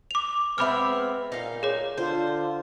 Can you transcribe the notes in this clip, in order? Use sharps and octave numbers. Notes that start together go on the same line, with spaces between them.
D6 F7
G#3 B3 C4 E5 B5 D6 F6
A#2 D#4 F5
G#4 C#5
D3 F4 C5